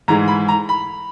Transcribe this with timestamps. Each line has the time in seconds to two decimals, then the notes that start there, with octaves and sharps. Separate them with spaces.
0.08 G#2 E3 G#3 A#5
0.28 B5
0.48 A#5
0.69 B5